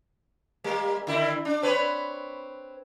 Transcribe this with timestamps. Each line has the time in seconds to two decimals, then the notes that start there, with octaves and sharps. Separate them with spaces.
0.64 G3 A#3
1.07 D3 E4
1.45 D4
1.62 C4 B4 C#5